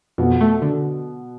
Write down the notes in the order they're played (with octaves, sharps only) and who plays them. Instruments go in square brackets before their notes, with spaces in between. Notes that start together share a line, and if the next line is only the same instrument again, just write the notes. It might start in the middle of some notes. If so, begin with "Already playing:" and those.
[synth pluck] F2 [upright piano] B2 B3
[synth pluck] A3
D3